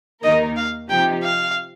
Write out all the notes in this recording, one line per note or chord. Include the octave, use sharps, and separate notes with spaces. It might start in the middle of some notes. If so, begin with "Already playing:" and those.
D#2 D#3 A#3 D#4 A#4 D#5
F5
C3 F3 D#4 G4 G5
F5